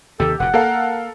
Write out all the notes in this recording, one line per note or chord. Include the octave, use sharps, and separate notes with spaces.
D#2 C3 D#3 G4 A4
F1 A#2 F#5
A#3 A4 A#4 F5